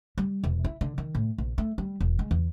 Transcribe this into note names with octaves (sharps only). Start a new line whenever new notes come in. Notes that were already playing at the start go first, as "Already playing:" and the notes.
G3
E1
E4
D3
D#3
A2
A#1
A3
G3
E1
G#3
E2